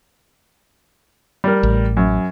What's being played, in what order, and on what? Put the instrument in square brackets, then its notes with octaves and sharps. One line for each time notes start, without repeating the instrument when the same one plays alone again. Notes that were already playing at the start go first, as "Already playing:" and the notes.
[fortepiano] G3 A#4
[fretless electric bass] A1
[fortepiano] F#2